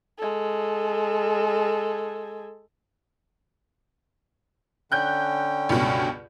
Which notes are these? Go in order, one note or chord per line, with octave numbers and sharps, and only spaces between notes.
G#3 A4
D3 C#4 G5 F#6 G6
C#2 G2 B2